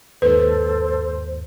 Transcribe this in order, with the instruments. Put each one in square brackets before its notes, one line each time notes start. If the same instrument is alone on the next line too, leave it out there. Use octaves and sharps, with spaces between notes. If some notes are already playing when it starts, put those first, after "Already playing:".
[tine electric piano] D#2 G#2 [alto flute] A4 [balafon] B4 [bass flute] C5